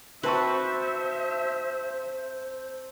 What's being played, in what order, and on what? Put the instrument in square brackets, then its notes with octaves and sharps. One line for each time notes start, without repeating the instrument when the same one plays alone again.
[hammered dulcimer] C4 A5 C#6 [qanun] F#4 B4 [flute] C5 [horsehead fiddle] E5